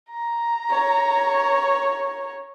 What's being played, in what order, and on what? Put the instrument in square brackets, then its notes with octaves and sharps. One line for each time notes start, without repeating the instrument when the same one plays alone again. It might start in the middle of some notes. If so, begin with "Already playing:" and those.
[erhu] A#5
[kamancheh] C#5